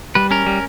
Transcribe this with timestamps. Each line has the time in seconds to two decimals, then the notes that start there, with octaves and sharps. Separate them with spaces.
0.15 G3 B4
0.31 C#4 A#4
0.46 G3